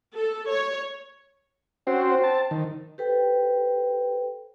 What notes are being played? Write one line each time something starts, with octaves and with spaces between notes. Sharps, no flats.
A4
C#5
C4 C#4 F#4 C5
A5
D#3
G4 A4 B4 C5 G5